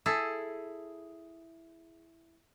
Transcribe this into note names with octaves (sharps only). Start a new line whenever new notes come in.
E4 G#4 A4